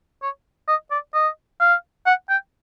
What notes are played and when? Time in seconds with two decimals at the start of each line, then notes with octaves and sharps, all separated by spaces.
0.22 C#5
0.68 D#5
0.91 D5
1.14 D#5
1.60 F5
2.06 F#5
2.30 G5